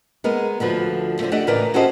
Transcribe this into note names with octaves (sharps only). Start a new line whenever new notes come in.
G#3 B3 A#4
D2 D3 F3 B4
A2 D3 F3 A3
A3 D4 G4 D#5 F#5
A2 C#3 E3 A#4 B4 D5
C#4 F#4 G4 A4 C5 D#5